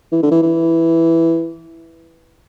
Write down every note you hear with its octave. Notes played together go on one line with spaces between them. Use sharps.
E3
D3
E3
E3